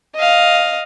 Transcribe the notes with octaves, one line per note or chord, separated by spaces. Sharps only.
D#5 F5